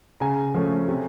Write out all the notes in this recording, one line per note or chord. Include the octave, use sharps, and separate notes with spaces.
C#3 G#5 A#5
F3 A3 C#4
C3